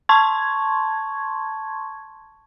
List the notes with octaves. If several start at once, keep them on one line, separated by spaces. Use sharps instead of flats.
A5 C6 C#6 G#6